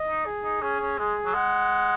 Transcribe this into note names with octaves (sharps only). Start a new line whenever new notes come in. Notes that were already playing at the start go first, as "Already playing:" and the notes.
Already playing: D#5
D#4
G#4
D#4
C#4 G#4
C#4
G#3 G#4
F#3
G#3 F#5